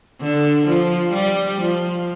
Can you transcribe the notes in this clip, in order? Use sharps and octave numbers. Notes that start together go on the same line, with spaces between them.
D3
F3
G3
F3